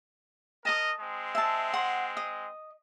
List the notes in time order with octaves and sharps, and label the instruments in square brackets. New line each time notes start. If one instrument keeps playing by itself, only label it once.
[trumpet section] A#4 D#5 [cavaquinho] A5 D#6
[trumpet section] G#3 C4
[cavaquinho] E5 A5
F#5 C6
D#5